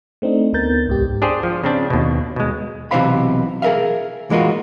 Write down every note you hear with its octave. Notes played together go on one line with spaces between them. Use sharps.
A3 C4 D4 D#4
D2 B3 A#4 G6 A6
C2 G#2 G4
D4 G4 G#4 C5
F3
C#3 C4 D4
D#2 B2
B2 G#3
B1 C3 E3 C5 F5 B5
G#4 A#4 B4 E5 F5
E3 G#3 A#3 F4 F#4